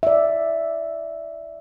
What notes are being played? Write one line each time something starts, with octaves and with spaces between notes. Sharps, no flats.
D5 E5